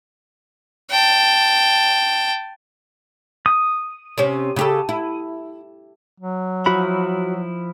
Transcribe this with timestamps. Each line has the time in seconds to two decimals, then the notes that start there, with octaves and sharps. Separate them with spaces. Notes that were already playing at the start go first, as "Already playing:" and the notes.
0.90 G5 A5
3.46 D#6
4.18 C3 C4 C#4
4.56 C#3 G4 A4
4.89 E4
6.20 F#3
6.66 F3 E4 F#4 B5